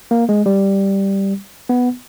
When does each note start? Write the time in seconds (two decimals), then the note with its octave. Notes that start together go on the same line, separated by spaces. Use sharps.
0.11 A#3
0.29 G#3
0.46 G3
1.69 B3